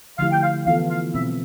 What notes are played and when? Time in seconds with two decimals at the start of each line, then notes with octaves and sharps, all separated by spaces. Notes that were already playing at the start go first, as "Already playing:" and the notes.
0.18 D3 F3 A3 E4 G4 F5
0.32 G5
0.43 F5
0.66 E3 B3 F4 A4 F5
0.90 F5
1.14 B2 G3 C4 E5